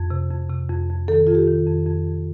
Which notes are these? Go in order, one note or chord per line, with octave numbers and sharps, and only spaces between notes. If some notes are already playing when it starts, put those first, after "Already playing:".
Already playing: F2
C3
F2
C3
F2
F2
D#3 A4
F2 F4
G4
D#3
F2
F2
F2